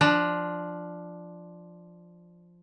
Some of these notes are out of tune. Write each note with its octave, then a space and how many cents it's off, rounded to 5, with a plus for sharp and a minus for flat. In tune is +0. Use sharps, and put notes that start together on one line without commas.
F3 +0 D4 +10